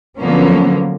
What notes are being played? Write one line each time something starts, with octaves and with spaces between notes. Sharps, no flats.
D3 F3 F#3 A#3 B3 C#4